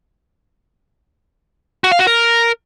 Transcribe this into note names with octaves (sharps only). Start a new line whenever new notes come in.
F#4
F5
F#4
A#4